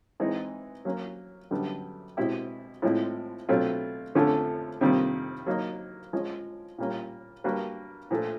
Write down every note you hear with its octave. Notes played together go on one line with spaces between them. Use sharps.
E3 G#3 C4 D#4
F#3 A#3 C#4
F#2 D3 G3 B3
B2 G#3 C4 E4 G4
A2 F3 G#3 C4 E4
B2 F#3 A3 C4 F4
F2 D3 F3 A3 C#4
F2 C3 D#3 G3 A#3
F#3 A#3 D#4
F3 G#3 C#4
A#2 G3 A#3 C#4
G3 A#3 D4 F#4 B4
A#2 F3 A3